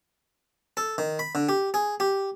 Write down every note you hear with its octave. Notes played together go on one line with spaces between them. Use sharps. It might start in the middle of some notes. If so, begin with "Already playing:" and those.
A4
D#3
B5
D3
G4
G#4
G4